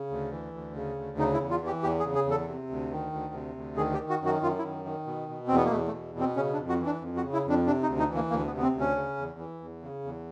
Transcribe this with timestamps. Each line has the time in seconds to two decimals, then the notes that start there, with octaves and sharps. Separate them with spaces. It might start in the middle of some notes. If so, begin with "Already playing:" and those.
Already playing: C#3
0.10 D2
0.31 E3
0.53 D2
0.75 C#3
0.96 D2
1.18 C#3 D#4
1.34 E4
1.40 E2
1.50 F4
1.61 E3
1.67 G4
1.83 E2 G4
2.00 G#4
2.05 C#3
2.15 G#4
2.26 E2
2.31 A4
2.48 C3
2.70 D2
2.91 D#3
3.12 D2
3.34 C3
3.56 D2
3.77 D#3 G#4
3.94 G4
3.98 D#3
4.10 F#4
4.20 F#2
4.26 F#4
4.42 F#2 F4
4.59 E4
4.63 D#3
4.85 D#3
5.06 B2
5.29 B2
5.48 E2 C4
5.56 B3
5.64 A#3
5.71 E2 A3
5.88 A3
5.93 B2
6.15 B2 C4
6.36 C#3 C#4
6.53 D4
6.58 F2
6.69 F#4
6.80 E3
6.86 D4
7.01 F2
7.17 F#4
7.23 C#3
7.33 E4
7.45 F2 D4
7.67 C3 D4
7.83 D#4
7.88 D2
7.99 D#4
8.09 E3
8.15 A#3
8.30 D2 A#3
8.47 B3
8.52 C3
8.57 B3
8.63 C4
8.74 D2
8.80 C#4
8.96 C#3
9.17 E2
9.39 E3
9.61 E2
9.82 C#3
10.04 E2